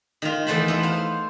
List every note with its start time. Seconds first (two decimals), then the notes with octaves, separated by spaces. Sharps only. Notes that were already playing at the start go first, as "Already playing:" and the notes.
0.22 D#3 F4
0.47 E2 E3 A3 C5 A5 B5
0.68 B3 E4
0.83 C5 F5